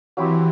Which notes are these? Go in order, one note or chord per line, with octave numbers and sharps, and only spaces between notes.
E3 F#3 C4 E4 G4